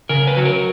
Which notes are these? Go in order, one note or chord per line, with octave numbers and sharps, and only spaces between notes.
C#3 A#4
B4
F#3
A#4